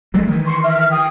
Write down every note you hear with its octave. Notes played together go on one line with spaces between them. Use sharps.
F#3 G#3 A3
D#3 E3
C6 C#6
E5 F6
G5 D#6